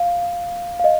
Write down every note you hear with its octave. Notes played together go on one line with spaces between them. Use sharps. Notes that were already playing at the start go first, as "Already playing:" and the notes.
Already playing: F5
F5
D#5